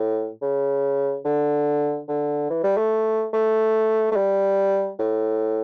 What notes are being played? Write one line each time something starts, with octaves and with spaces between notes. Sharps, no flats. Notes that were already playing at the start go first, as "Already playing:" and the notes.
Already playing: A2
C#3
D3
D3
E3
G3
A3
A3
A3
G3
A2